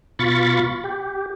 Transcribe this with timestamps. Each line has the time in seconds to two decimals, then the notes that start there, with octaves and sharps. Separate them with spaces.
0.19 B2 F4 B5 C#6 A6
0.84 G4